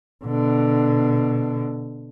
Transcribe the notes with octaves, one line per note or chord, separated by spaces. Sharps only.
B2 D3